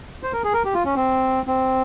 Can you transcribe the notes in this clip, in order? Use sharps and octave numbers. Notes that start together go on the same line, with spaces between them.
C5
A#4
G#4
A#4
G4
F4
C#4
C4
C4